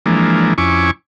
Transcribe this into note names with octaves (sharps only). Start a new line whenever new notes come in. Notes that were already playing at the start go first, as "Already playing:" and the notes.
E3 F3 G#3 A#3 D4
F2 C#4 E4 G#5 C#6 D6